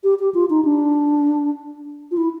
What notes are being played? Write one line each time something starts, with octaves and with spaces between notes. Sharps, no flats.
G4
G4
F4
D#4
D4
F4
E4